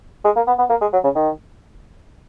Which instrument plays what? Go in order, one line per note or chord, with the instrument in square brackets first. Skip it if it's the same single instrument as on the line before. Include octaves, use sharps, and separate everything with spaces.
[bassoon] G#3
A#3
B3
B3
A#3
G#3
F#3
C#3
D#3